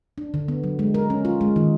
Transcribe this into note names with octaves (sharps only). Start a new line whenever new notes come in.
D4
D3
B3
F#3
G#3
A#4
C#4
F4
G#3
D#3